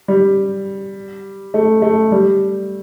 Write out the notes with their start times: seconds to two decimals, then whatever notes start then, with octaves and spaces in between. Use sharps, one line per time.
0.08 G3
1.54 A3
1.82 A3
2.12 G3